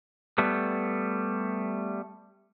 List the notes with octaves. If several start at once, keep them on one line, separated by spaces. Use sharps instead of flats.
G3 A3 B3